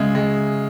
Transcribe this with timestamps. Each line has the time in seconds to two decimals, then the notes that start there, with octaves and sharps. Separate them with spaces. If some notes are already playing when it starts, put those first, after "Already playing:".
Already playing: C#3 G#3 E5
0.15 G#3